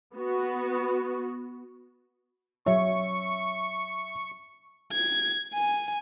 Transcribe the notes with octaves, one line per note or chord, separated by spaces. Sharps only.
B3 F#4
F#3 C#5 E5 C#6
G#6
G#5